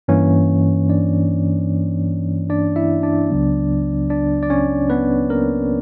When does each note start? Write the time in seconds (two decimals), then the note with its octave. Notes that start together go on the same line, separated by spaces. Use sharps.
0.08 G2 E3 A#3 C#4 C#5
0.89 D4 D5
2.50 D4 D5
2.76 E4 E5
3.03 D4 D5
3.30 C#2 C#3 F#3 B3
4.10 D4 D5
4.43 D5
4.50 C#4 C#5
4.90 B3 B4
5.30 A#3 A#4